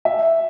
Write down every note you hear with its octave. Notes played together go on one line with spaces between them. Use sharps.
E5